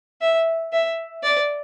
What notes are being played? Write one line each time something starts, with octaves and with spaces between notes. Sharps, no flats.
E5
E5
D5